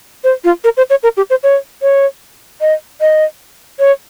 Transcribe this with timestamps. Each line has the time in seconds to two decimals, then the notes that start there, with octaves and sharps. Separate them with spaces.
0.24 C5
0.44 F4
0.64 A#4
0.77 C5
0.90 C#5
1.03 A#4
1.17 G4
1.30 C5
1.43 C#5
1.82 C#5
2.61 D#5
3.01 D#5
3.79 C#5